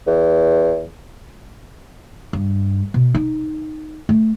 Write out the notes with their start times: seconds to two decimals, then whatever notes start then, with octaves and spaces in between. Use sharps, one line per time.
0.07 E2
2.33 G2
2.94 B2
3.15 D#4
4.09 A3